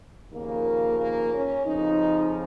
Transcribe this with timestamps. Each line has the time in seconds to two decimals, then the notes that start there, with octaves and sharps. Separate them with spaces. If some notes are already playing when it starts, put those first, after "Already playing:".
0.32 D#2 C#3 F3 A#3
0.98 A#3
1.33 C#4
1.65 F2 C#3 F3 D#4